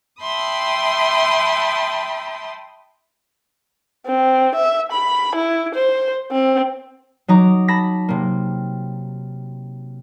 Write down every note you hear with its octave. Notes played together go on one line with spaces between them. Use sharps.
E5 G5 A5 B5 C6 D#6
C4
E5
B5
E4
C5
C4
F#3 D#4 A#5 D6
A5 B5 A#6 B6
C3 A#3